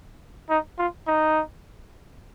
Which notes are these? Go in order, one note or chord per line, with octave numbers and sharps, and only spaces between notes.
D#4
F4
D#4